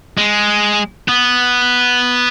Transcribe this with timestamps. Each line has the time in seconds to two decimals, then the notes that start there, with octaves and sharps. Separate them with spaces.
0.18 G#3
1.08 B3